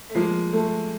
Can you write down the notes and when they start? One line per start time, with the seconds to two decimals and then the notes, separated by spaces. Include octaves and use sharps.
0.10 A3
0.15 F3 G#3 A#3
0.53 A3